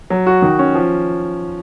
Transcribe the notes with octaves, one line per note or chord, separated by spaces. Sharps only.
F#3
F#4
D#3
C#4
F3